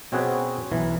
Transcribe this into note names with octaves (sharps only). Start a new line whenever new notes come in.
B2 C4 C#4 F#4 G#4 B4
B1 E3